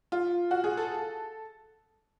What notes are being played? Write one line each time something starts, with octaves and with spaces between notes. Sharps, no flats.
F4
F#4
G#4
A4